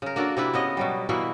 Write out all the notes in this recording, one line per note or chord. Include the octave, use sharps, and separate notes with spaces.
C#3 A#4
A#3 D4 F#4 A4
C3 D4 E4 B4
C#3 B3 D#5
B2 F#3 G3
B2 E3 A#3 E4